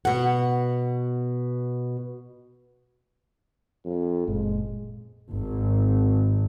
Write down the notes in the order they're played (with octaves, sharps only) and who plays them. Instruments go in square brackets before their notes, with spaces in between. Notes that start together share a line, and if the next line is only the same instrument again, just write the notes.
[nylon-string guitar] B2 F#5
[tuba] F2
[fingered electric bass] F#1 A#2 [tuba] G#3
[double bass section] G#1